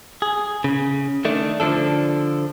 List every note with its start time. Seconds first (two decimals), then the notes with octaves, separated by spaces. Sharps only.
0.22 G#4
0.64 C#3
1.25 D#3 A3 D4
1.60 D3 F3 D4 A4